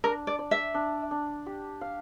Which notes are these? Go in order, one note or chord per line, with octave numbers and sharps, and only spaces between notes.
D4 A#4
D5
D5
E5
D4
D4
G4
F5